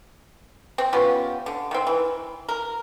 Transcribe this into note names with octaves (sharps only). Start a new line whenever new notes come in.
C4
B3 C#4 F4 G4
D3
D#3 C4
E3
A#4